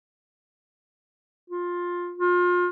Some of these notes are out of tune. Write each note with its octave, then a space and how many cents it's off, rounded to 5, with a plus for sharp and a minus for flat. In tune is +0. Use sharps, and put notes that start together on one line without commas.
F4 +15
F4 +30